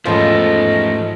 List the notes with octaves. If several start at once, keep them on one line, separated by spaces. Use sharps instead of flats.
E2 G#2 F3 A3 B3 C#4 D#5